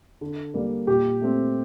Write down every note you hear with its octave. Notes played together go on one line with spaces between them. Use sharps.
D3
G3 A#3
A#2 G4
A3 C4